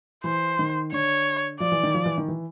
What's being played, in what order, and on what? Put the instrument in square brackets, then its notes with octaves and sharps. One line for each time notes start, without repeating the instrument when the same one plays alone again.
[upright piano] E3 [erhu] C5
[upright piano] D#3
[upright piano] D3 [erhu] C#5
[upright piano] F3 [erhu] D5
[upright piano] E3
D#3
F3
E3
D#3
E3